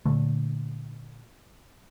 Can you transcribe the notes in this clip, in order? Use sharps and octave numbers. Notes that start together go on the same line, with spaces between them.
A#2 D3 A3